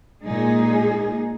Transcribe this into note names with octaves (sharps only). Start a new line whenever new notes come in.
A#2 G#3 D#4 G#4